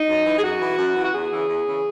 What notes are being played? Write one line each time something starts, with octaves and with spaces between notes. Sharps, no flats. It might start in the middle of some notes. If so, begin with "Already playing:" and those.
Already playing: D#4
F#2
E3
G#4
F#2 F#4
E3
F#2
E3
F#4
E2 G#4
C#3 E3
E2
C#3 E3